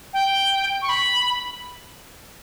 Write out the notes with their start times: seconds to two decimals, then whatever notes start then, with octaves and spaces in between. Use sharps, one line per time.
0.13 G5
0.81 C#6
0.88 B5